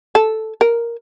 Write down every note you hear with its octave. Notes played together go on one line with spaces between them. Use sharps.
A4
A#4